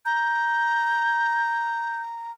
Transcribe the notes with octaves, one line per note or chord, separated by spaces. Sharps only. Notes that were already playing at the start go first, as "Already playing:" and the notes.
A#5 G6